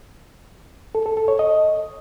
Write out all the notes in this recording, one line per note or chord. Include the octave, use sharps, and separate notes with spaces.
A4
A4
A4
C#5
D#5